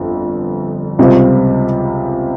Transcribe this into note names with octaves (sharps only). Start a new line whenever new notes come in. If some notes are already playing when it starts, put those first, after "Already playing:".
Already playing: G1 F2
C#2 C3 G3 C4 F4